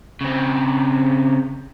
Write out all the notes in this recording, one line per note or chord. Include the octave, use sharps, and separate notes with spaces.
C#3 C4